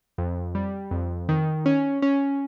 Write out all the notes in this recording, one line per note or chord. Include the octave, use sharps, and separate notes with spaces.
F2
G3
F2
D#3
C#4
C#4